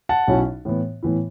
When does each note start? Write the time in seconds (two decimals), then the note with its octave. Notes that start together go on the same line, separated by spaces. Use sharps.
0.09 F#5 A5
0.28 B1 B2 F#3 C#4 E4
0.65 A2 E3 B3
1.03 A2 E3 B3 E4